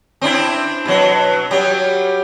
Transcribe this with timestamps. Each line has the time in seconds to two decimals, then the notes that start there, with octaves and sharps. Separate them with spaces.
0.21 C4 D4 E4
0.86 B2 F#3
1.51 F#3 G3